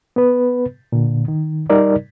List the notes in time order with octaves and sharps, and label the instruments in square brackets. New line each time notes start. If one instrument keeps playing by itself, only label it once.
[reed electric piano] B3 B4
A#2 D3
D#3
G3 D#4 A#4 D5